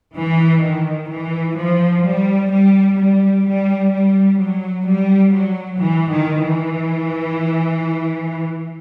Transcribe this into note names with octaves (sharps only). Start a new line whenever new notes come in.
E3
D#3
E3
F3
G3
G3
G3
G3
G3
F#3
G3
F#3
E3
D#3
E3